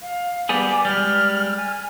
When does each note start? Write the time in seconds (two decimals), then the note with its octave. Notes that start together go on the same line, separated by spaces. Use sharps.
0.02 F5
0.49 G3 B3 G#4 D6
0.85 G3 G#3 F6
1.57 G#5